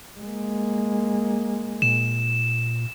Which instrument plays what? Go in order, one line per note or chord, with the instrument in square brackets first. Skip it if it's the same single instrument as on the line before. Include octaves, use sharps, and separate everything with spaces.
[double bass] G#3 A#3
[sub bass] A#2 [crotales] E7